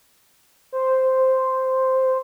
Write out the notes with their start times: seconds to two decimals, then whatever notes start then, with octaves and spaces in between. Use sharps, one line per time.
0.72 C5